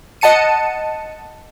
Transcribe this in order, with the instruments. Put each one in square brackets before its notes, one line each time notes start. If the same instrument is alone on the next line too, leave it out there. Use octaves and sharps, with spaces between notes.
[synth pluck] D#5 F#5 A5 C#7 D#7